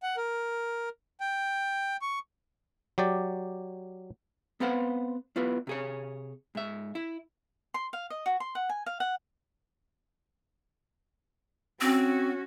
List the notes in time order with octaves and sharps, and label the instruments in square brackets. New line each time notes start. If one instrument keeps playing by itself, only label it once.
[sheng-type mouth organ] F#5
A#4
G5
C#6
[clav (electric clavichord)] F#3 G4 D5
[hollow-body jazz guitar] B3 C4 B4 C5 F5 F#5
B3 E4 F4 B4
C3 G#4 C#5
G#2 E5
E4
[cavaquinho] C6
F5
D#5
F#4
C6
F#5
G#5
F5
F#5
[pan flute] C4 [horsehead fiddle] C#4 F#4